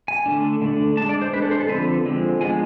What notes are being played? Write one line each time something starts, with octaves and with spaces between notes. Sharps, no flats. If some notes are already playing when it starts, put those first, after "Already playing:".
G#5
D3 A3 D4
D3 A3 D4
G#3 D4 A5
D5
C5
G#3 D4 B4
A4
C5
A4
D3 F3 G#3 C4 B4
D3 F3 G#3 C4
F3 G#3 B3 D4 G#5